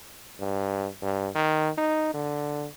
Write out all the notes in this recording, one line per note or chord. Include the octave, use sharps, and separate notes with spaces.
G2
G2
D#3
D#4
D3